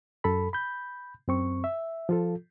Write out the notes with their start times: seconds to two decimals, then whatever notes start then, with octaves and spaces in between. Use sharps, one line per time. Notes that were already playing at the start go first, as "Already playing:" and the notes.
0.24 F#2 A4 B5
0.53 B5 G6
1.28 F#2 C4 C#6
1.64 E5
2.09 F3 F4 A4